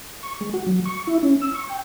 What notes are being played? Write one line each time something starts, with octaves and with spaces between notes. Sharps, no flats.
C#6
G#3
F#4
F#3
C#6
E4
C#4
E6
C#6
G5